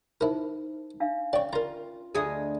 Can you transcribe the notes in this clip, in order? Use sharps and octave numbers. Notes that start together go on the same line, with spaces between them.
D#4 E4 A#4 C5
D4 E5 F5
C#4 C#5 D5 E5 G5 A5
F4 A#4 A#5
D2 G#4 D#5